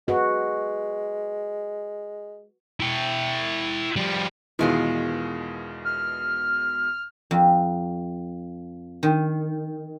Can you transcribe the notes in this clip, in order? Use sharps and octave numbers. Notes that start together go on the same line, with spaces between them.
G#3 F#4 B4
E4 G5
F3 G3
E2 B2 D#3 E3 G#3 F4
F6
F2
D#3